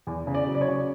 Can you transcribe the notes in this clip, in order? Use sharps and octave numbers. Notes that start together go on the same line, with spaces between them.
E2
C#3
D5
F#3
D5
C#5
C#3